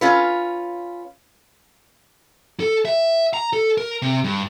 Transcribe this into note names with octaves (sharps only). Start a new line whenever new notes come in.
C#4 F4 B4
A4
E5
A#5
A4
A#4
C3
G2